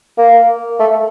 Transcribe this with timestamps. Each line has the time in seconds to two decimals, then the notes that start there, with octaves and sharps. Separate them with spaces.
0.18 A#3
0.79 A3